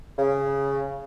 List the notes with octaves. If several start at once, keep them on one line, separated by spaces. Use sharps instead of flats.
C#3